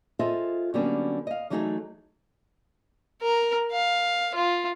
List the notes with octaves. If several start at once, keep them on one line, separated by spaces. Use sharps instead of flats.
F4 G#4 A4 C5 D#5 E5
D3 F#3 G3 A#3 B3 C#4
D#5 F5
E3 F#3 A3 D#4 G#4 A4
A#4
F5
F4